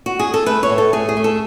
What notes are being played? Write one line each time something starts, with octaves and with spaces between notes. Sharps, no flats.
F#4
G#4
A4
A3 B4
C#5
A2
A4
A3 G#4
G#4
A3
A4